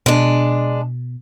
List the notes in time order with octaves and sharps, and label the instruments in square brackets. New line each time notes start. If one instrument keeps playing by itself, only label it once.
[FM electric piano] B2 [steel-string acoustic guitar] G#3 D4